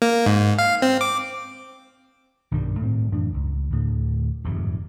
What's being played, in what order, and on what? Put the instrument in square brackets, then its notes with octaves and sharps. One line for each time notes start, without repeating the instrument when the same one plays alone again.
[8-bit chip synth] A#3
G#2
F5
C4
D6
[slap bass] B1 G2 D#3 G3
A2 C4
F#2 A2 E3 D4
C#2
D2 A2 D3
D#1 F2 G#2 C3